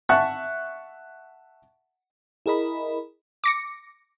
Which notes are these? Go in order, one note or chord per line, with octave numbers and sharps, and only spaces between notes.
E5 F#5 A5 C#6 F#6
E4 G#4 A#4 D#5 B5
D6 A#6 C#7